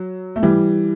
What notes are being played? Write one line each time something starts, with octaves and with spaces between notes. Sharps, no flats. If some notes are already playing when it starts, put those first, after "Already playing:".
Already playing: F#3
A3
E3 G3